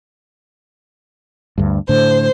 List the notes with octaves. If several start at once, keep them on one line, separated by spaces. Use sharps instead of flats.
D2 G2
A2 D3 C5